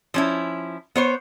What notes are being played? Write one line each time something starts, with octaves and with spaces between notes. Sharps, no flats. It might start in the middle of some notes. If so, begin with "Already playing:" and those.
F3 C#4 E4
B3 C5 C#5